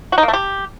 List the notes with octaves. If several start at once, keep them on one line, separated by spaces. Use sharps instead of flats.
F#4
D#4
A#3
A3
G4